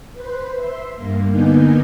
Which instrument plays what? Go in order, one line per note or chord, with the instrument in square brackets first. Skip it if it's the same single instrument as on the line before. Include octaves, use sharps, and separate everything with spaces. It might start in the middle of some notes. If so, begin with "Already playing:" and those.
[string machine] B4 C5
E5 C6
G2 A#3
D3 A#3 B3 D#4 G#5 G6